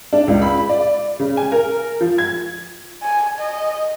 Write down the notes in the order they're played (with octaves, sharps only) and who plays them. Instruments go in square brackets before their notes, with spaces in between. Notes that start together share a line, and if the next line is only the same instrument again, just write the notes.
[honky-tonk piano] D4
C#2
B5
D5
C#3
G#5
A#4
F3
G#6
[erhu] G#5
D#5